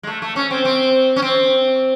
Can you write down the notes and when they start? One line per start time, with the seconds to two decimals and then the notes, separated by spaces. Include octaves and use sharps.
0.03 G#3
0.07 A3
0.22 A3
0.36 C#4
0.51 C4
0.65 C4
1.16 C#4
1.22 C4